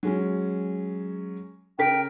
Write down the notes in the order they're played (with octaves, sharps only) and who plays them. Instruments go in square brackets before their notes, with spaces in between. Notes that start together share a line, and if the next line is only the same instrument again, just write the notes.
[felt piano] F#3 G#3 C#4
[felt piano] C#3 A#4 B6 [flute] G5